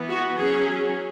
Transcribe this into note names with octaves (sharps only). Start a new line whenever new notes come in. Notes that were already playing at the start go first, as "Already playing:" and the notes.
Already playing: E3 B3
F#4
F#3 C#4 G#4